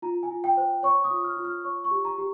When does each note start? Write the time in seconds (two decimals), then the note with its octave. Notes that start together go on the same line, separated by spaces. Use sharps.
0.02 F4 A#5
0.23 G#5
0.29 F4
0.44 G5
0.57 C5
0.83 C#5 C#6
1.04 D#6
1.10 F4
1.24 F6
1.37 F4
1.45 F6
1.64 C#5 C#6
1.84 C#6
1.91 G4
2.05 A#5
2.18 G4